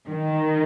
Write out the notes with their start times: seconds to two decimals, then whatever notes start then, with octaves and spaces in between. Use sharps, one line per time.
0.09 D#3